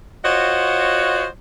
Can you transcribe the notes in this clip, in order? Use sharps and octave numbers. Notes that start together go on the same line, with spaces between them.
F4 F#4 C5 C#5 D#5 F#5